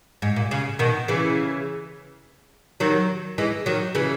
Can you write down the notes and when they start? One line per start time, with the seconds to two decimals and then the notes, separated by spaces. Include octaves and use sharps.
0.22 G#2
0.36 A#2
0.51 C#3
0.79 B2 D#3
1.08 C#3 E3
2.80 D#3 F#3
3.38 E3 G#3
3.66 D#3 F#3
3.95 C#3 E3